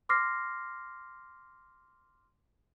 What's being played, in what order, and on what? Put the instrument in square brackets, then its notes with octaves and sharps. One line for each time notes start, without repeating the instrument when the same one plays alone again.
[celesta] C6 D6 F6 A#6 C7